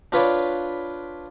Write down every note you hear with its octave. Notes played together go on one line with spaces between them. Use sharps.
D4 F4 B4 C#5 D5